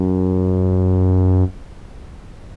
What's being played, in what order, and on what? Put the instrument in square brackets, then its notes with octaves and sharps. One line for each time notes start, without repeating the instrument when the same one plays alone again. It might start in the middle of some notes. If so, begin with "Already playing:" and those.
Already playing: [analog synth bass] F#2